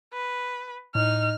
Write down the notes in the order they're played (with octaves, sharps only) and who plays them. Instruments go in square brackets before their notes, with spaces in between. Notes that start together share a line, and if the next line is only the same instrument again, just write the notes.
[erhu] B4
[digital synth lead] A2 [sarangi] D#4 [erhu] F6